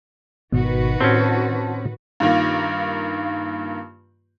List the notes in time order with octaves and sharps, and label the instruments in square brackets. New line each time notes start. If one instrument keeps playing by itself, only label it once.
[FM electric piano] G#1 B2 [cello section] D#3 F#4 B4
[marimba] A2 [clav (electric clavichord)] C4 C#4 [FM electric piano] F#5 A5 C6
[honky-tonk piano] G2 D#3 A#3 F4